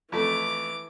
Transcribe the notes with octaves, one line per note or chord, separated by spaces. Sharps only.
F2 E3 A3 D6